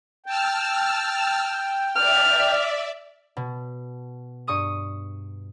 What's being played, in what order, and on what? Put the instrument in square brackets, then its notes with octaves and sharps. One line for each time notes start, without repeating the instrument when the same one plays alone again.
[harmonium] G5 [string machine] A5 E6 F6
[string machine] D5 E5 [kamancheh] F6
[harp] B2
G2 C#6 D#6 D#7